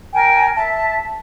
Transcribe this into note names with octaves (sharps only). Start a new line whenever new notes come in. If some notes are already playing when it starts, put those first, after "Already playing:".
A#4 G5 G#5
E5 A5